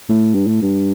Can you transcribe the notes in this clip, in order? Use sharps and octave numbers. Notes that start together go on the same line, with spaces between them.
A2
G2
A2
G2